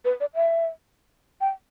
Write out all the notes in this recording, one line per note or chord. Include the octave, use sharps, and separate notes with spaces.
B4
D5
E5
G5